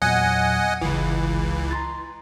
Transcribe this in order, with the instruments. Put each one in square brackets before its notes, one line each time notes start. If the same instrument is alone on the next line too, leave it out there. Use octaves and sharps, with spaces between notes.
[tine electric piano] E2 A#2 F#3 [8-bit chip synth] D#5 F#5 G#5
[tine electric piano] G1 [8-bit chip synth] C#2 E3
[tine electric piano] A#5 C6 A6